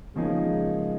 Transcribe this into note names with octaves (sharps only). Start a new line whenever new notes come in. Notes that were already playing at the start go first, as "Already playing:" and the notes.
C#3 F3 G#3 A#3 D#4 G#4